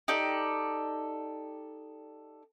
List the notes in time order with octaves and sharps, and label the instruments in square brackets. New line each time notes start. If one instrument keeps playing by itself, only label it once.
[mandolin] D#4 G4 A4 D5